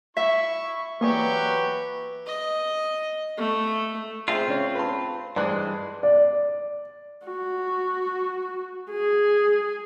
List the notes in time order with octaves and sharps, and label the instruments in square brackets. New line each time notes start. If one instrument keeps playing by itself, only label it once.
[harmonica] E4 C#6 [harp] E5
[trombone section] E3 B4 [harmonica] F#3 G4 C#6 [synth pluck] A#3 G#4 D5
[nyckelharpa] D#5
A3
[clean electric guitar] C4 F4 [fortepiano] G#4 C5 E5
[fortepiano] C#3 C#5
B4 A5 C6
[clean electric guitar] G2 E3 G#3 [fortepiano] C5 D5 F#6
[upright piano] D5
[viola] F#4
G#4